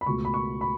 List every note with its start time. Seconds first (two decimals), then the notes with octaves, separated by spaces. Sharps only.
0.01 B5
0.06 C#2 B2 A3 C#6
0.25 B5
0.34 C#6
0.61 B5